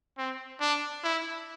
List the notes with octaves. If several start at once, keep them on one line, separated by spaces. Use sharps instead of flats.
C4
D4
E4